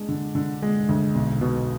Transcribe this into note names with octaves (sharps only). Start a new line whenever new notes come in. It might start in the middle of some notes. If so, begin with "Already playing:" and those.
Already playing: G#3 D4
D3
D3
G#3
D2
B1
B2